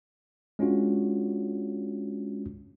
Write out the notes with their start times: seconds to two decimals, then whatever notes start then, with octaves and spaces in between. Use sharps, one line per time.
0.59 G#3 C#4 D4 F4 F#4